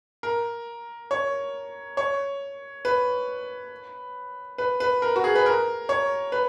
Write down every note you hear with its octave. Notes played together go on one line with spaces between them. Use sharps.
A#4
C#5
C#5
B4
B4
B4
A#4
F#4
G#4
B4
A#4
C#5
B4